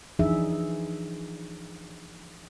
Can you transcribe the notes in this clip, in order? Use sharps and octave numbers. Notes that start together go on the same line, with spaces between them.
E3 F3 D4 D#4 G#4 E5